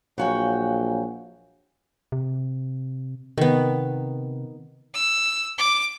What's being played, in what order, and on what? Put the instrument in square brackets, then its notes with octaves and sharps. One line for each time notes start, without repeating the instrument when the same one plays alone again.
[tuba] A#1 [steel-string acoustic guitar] F#3 F#4 G5 [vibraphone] C#5 F5 G#5
[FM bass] C3
[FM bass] C3 [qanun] D#3 B3
[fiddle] E6
D6